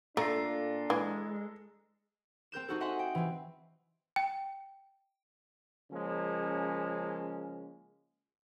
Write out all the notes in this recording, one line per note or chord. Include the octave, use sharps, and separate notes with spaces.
A#2 A3 D4 F4 A4 A#5
E3 G#3
C4 A#4 G6 E7
D#4 F#4 A4
D#5 E5 F#5 G#5 C6
G5
E3 C4
G5
C#3 F3 G#3 A#3 C#4